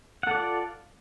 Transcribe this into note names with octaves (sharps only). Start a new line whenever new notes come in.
F4 A4 D5 F#5